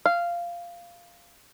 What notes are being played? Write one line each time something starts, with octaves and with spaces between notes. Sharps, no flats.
F5